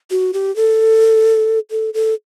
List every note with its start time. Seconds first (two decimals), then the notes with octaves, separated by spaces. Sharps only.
0.11 F#4
0.34 G4
0.56 A4
1.71 A4
1.94 A4